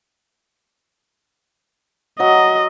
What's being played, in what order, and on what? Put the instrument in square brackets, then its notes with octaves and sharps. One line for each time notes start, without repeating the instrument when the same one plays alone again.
[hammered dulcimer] F#3 [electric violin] D#5